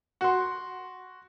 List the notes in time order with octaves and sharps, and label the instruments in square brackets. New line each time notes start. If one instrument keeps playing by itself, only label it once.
[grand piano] F#4 C6